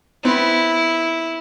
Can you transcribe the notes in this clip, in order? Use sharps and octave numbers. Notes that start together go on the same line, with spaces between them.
B3 C4 E4